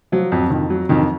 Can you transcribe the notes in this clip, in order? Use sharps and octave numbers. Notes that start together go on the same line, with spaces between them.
F3 F#3
F2
F2 D#3
F#3
F2 D#3